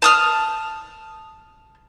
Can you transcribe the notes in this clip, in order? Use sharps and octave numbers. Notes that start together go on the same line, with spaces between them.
A5 D#6 F6